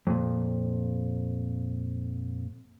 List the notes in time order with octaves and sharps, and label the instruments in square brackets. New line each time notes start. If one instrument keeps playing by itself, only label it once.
[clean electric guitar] F2 A#2